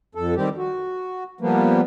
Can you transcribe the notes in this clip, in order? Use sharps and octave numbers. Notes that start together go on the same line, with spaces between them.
F2 A4
D#3 G3 C4 G4
F#4
F3 G3 A#3 B3